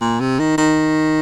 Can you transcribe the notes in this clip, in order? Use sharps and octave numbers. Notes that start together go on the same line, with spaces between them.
A#2
C3
D#3
D#3